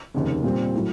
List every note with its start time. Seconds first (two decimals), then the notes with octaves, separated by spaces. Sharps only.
0.14 F1 D#2 C#3
0.43 A#2 G3 C4
0.75 A2 F#3